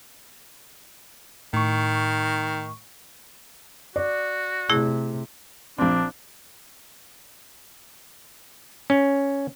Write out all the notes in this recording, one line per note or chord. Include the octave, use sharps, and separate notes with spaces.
A2 D#3 C#6
F#4 D5
C3 A3 E4 G#4
A#1 C4 D4
C#4